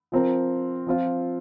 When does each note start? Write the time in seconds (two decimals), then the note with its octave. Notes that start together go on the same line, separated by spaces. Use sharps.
0.12 F3 C4 A#4
0.87 F3 C4 F4